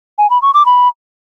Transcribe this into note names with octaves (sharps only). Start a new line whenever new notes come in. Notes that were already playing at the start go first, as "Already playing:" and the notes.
G#5
B5
C#6
D6
B5